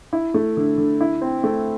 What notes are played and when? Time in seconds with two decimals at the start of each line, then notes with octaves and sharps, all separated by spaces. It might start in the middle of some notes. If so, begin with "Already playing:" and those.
0.13 E4
0.34 A3
0.57 D3
0.78 D3
1.01 E4
1.22 C4
1.44 A3